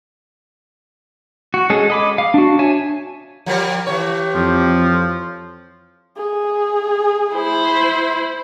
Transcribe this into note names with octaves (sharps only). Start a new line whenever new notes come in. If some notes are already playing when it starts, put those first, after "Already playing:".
F#4
G#3 C#4 G#4 A4
D#5 B5 D6
F5
D4 F#4
C#5 E5 G#5 A5
F3 G3 A#4
E3 G4 C#5
F2 F3
G#4
E4 C5